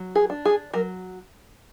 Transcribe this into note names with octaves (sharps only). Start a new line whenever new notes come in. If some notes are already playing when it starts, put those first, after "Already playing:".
Already playing: F#3
G#4
D4
G#4
F#3 A#4